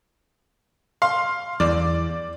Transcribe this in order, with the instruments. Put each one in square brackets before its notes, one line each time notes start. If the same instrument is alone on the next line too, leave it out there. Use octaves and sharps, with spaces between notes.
[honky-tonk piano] F5 C6
[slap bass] E2 [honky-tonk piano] D5